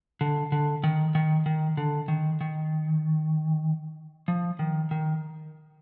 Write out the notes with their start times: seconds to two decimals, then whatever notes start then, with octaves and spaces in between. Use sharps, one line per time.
0.21 D3
0.52 D3
0.84 D#3
1.15 D#3
1.46 D#3
1.77 D3
2.08 D#3
2.41 D#3
4.28 F3
4.59 D#3
4.91 D#3